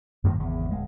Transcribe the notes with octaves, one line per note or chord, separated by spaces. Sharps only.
F#2 A#2 D#3 F#3
G#1 E2 C#3
D1 G#3